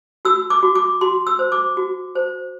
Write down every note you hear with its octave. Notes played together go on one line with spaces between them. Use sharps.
F#4 E6
D6
F#4
D6
F#4 C6
E6
C5
D6
F#4
C5